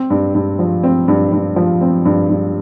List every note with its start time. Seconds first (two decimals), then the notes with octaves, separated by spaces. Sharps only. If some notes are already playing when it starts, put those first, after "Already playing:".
Already playing: C4
0.10 G2
0.35 G2
0.59 F3
0.83 C4
1.08 G2
1.32 G2
1.56 F3
1.81 C4
2.05 G2
2.30 G2